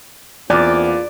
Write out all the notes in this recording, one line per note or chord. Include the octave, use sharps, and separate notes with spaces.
E2 A#3 C4 F4 D5